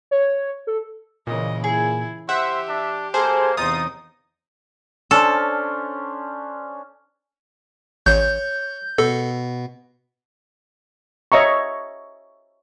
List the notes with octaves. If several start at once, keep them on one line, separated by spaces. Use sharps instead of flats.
C#5
A4
A#2 C#3 E3 D#5
E4 G#4
G4 C5 E5 F#5
D4
A#3 G#4 A4 C5
E2 C3 D#4 F4 C5 D#6
C#4 D4 A4 C5
A1 C#5 G6
B2 A4
C#5 D#5 E5 A#5 C#6